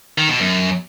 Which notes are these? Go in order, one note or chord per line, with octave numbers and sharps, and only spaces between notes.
D#3
B2
F#2